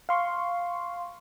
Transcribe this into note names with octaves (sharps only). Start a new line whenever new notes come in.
F5 C6 C#6